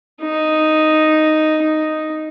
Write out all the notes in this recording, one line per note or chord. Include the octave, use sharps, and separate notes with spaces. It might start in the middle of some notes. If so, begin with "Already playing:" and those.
D#4
D#4